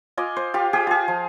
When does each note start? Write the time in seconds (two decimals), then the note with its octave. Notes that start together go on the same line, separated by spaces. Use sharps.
0.17 F4 D#5 G#5 D6
0.36 C5
0.54 F4 G4 F5
0.73 G4 G#4 G5
0.87 F4 G#4
1.08 F3